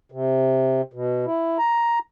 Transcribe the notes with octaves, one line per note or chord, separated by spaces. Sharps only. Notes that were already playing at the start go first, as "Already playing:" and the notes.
C3
B2
E4
A#5